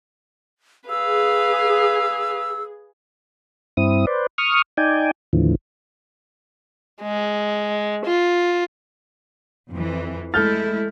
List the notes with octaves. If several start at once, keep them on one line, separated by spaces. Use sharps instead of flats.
G#4 B4 F5 E6
G2 C4 E4 D#6
B4 C5 D5
C#6 D#6 F6
D#4 D5 G5 G#5
D#2 A2 D3 E3 F3
G#3
F4
F2 E3
G#3 A3 E4 A4 F6 G6 A6